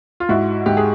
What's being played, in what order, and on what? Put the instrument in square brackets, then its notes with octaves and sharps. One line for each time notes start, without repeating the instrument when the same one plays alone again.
[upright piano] F4
G#2 E4 F#4
G#2 G4
G#4